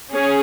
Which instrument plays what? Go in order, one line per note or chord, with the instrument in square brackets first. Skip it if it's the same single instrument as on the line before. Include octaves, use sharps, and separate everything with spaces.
[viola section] C#4 G#4